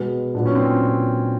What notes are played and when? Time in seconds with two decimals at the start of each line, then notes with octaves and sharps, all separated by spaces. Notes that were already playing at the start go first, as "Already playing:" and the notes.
Already playing: B2 G#3 B3
0.34 A#2 F#3 B3 D4
0.46 C#4
0.55 C4
0.66 C#4